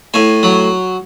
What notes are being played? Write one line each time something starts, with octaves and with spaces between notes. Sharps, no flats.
A2 G#5
F#3